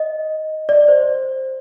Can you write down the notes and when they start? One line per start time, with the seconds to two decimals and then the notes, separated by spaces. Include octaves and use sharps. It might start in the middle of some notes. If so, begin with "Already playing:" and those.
Already playing: D#5
0.69 D5
0.88 C5